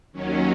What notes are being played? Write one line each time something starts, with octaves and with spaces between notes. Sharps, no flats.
D#2 D#3 F#3 C#4